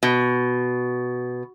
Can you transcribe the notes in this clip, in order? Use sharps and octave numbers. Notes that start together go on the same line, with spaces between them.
B2